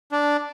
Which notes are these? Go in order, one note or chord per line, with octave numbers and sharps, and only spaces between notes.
D4